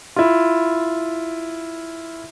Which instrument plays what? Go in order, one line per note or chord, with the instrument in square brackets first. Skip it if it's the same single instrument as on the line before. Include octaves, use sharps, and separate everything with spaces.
[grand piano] E4 F4